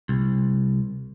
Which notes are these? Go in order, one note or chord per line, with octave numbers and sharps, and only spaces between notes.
C2